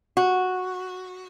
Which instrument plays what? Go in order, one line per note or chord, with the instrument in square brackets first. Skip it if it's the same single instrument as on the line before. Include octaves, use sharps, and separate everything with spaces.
[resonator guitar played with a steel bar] F#4